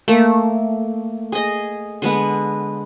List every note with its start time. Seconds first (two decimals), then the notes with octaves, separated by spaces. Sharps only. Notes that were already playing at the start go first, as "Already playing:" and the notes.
0.08 A3 A#3 A4
1.32 G#4 D#5
2.02 D3 G#3 B3